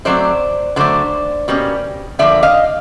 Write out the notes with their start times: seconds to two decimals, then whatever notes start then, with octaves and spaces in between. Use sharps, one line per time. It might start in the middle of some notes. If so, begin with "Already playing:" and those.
0.05 B2 F#3 A3 C4 C5 D5
0.76 D3 F#3 A3 C5 D5
1.48 B2 G3 A#3 C#4
2.19 D3 F3 A#3 D5 E5
2.43 D#5 F5